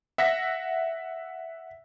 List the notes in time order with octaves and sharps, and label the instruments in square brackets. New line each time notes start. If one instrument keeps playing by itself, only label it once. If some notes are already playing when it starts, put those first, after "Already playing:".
[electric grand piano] E5 F#5 E6 A#6 B6